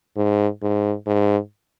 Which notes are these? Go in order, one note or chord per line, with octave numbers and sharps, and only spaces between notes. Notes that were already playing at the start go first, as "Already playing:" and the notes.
G#2
G#2
G#2